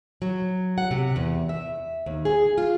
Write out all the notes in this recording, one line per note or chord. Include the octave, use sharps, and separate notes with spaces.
F#3
F#5
C3
E2
E5
D#2
G#4
F4